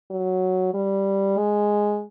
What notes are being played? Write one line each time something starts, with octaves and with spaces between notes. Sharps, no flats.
F#3
G3
G#3